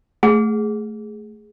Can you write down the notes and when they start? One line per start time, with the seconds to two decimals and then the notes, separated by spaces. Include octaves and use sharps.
0.23 A3 G#4 F#5